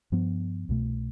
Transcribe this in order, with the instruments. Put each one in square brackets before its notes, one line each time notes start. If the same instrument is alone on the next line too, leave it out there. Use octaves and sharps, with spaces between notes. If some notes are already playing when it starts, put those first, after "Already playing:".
[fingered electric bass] G2 F3 B3
C2 B2 A3